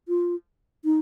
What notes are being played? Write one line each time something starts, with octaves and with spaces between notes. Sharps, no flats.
F4
D#4